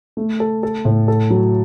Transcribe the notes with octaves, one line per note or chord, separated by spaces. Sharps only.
A3
A4
A4
A2
A4
F#3